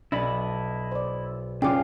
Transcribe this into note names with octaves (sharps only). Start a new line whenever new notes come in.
B1 D4 E4 D#5 A5 B5
C5 D5
F#1 C#4 D4 F4 G#4 G5 G#5 D6